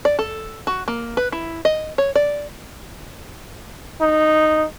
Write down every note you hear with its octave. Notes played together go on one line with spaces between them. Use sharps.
D5
A4
F#4
A#3
B4
E4
D#5
C#5
D5
D#4